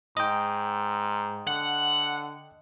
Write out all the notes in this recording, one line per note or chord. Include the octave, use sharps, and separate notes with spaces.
G#2 D#5 G5
D3 F#5